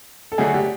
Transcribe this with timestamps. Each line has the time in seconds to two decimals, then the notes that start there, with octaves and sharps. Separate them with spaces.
0.32 A4
0.38 D3 F#3 A3 D4 F#4 G#4
0.54 G4